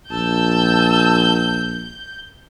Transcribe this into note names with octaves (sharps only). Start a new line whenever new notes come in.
A#1 A5 E6 G6